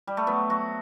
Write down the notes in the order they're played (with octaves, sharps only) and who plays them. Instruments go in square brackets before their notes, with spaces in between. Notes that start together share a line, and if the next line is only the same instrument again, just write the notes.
[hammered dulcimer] G3
A3
F#3 B3
F#3 F#4